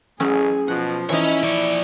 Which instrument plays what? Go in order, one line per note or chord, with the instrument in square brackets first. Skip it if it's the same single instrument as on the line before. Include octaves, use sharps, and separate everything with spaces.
[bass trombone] A1 [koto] F#3 C#4 [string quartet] G#4
[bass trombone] B2 [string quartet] F3 [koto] F#5
[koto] E3 D#4 [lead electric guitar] C#4 C#5 [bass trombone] E4
[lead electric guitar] F3 D5 [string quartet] C#6